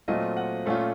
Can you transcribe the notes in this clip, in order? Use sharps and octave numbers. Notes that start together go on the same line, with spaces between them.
A#2 F#3 A3 C4 F4 D#5
F#5
A#2 A3 C#4 F4